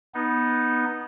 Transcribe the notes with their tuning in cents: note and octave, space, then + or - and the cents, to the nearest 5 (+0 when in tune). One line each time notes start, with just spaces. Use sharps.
B3 -10 D#4 +0